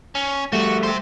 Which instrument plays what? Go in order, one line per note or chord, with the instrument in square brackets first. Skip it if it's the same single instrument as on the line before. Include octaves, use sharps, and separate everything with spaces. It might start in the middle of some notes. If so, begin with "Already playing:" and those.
[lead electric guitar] C#4
[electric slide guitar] G3 A3 [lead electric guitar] F#4
[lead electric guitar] G4 C5